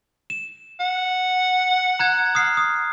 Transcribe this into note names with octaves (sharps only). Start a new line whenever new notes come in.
E7
F#5
A#5 F#6 G#6
D#6 F6 C7
D#6